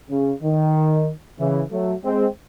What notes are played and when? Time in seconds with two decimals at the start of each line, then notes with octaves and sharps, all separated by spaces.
0.10 C#3
0.42 D#3
1.39 C#3 E3
1.71 F#3 A3
2.04 G#3 C4